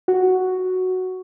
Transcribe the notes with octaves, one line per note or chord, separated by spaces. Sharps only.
F#4